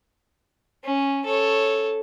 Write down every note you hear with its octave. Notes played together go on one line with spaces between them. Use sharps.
C#4
A4 C#5